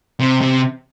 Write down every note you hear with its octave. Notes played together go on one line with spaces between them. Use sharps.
C3
C3